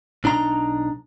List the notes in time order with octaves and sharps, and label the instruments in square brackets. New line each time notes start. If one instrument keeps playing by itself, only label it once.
[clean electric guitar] B1 D4 D#4 A#5